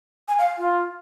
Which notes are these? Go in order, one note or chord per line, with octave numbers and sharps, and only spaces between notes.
G#5
F5
F4